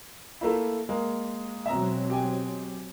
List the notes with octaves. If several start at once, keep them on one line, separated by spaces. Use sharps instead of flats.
A3 A#3 E4
G#3 A#3
B2 F#3 C4 E5 A#5
G4 G5 G#5